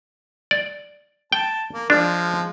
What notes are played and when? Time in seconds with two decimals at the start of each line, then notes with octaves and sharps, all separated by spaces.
0.51 D5
1.32 G5 A5
1.74 A#3
1.90 F3 G#3 D4